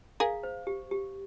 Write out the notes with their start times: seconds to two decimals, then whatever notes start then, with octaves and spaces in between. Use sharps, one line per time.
0.20 G#4 A#4 F5
0.43 C5
0.67 G4
0.91 G4